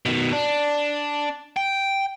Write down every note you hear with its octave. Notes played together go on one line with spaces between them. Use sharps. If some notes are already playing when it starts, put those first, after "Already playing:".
B2 D#3
D4
G5